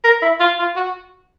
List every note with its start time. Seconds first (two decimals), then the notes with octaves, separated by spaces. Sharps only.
0.04 A#4
0.22 E4
0.40 F4
0.59 F4
0.77 F#4